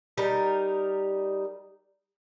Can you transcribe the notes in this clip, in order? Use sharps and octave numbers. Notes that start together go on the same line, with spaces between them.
G3 D#4 A#4